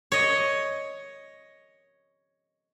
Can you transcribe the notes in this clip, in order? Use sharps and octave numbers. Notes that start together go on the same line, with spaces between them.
C#5 D#5